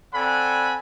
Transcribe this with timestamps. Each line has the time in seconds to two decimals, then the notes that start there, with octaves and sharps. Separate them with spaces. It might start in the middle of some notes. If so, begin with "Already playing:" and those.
0.14 C4 A4 D5 F#5 G#5 B5